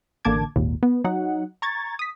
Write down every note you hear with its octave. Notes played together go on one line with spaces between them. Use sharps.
A1 D3 A#3 A5 D6 G#6
G#1 D#2 A#2
B3
F#3 D#4 F#5
A#5 C#6 G#6 A6
D#6 B6